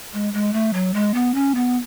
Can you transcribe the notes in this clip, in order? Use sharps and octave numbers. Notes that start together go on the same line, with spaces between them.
G#3
G#3
A3
F#3
G#3
B3
C#4
B3